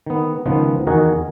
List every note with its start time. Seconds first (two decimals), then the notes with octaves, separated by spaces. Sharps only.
0.06 D#3 B3
0.46 C#2 D#3 F3 B3
0.87 E2 D#3 F#4 A#4 D#5 G#5